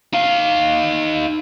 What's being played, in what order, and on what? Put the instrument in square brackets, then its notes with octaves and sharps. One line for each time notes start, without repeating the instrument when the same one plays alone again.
[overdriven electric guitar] D#4 F5